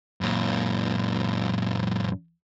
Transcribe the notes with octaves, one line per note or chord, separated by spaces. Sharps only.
F#2 A#2